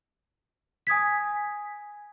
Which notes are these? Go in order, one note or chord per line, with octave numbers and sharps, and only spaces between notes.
G#5 D#6 G#6 B6